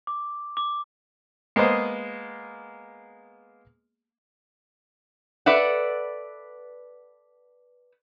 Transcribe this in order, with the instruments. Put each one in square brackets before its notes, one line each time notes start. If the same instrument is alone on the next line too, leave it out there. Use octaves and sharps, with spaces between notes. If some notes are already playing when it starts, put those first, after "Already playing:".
[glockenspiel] D6
D6
[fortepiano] G#3 A#3 B3 G#4 C5 D#5
[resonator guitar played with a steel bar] A4 B4 D5 E5 F#5